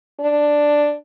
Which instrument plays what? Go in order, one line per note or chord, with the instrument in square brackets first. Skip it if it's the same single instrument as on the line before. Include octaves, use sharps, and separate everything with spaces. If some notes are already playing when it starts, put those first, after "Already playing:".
[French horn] D4